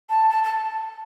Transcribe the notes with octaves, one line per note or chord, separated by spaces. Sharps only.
A5
A5
A5